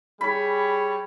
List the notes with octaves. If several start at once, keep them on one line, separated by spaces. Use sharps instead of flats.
G3 G#4 C#5 B5